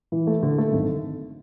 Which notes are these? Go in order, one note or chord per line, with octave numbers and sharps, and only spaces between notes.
E3
A3
D3
A3
G#1